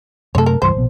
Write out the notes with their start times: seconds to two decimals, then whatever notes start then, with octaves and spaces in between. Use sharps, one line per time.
0.35 F#2 C3 A3 A4 C#5
0.46 A#4
0.62 C#2 G2 E3 C5
0.75 A#1 B2